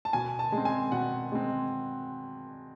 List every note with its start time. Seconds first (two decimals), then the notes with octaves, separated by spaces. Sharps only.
0.05 A5
0.13 B2 G#5
0.39 A5
0.52 G#3
0.58 C4
0.65 G#5
0.92 B2 F#5
1.32 G#3 C4